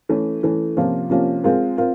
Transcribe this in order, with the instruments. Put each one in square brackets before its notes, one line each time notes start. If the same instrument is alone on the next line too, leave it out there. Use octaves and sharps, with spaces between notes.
[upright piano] E3 A3 C#4
E3 A3 C#4
C3 F3 A#3 C#4 F4
C3 F3 A#3 C#4 F4
G#3 C4 F4 A#4
C4 F4 A#4